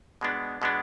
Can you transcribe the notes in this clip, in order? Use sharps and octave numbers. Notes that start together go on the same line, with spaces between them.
B2 G#3 B3 D4
B2 G#3 B3 D4